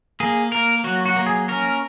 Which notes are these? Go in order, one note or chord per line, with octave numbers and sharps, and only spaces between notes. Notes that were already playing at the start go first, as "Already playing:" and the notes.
A#3 G#4
A#3 A#4
F#3 F#4
F#4
A#3
G#4
C#4 A#4